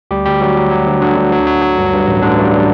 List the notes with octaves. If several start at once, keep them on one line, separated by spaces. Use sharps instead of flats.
D2 G3 G4
D2 G3 G4
D2 F#3 F#4
F#3
F#3
D2
D3 F#3 D4
D2
F#3
F#3
F#3
G2
G2
A1
A1 D3 D4
G2